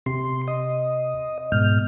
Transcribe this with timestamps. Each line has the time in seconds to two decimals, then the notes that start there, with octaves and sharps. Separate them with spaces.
0.06 C3 C6
0.48 D#5
1.52 G#2 B2 F6 G6